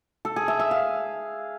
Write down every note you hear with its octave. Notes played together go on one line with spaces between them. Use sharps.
A4
G#4
E5
E5
F5